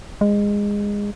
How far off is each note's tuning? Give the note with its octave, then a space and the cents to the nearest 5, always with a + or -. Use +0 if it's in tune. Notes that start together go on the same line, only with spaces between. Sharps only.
G#3 -20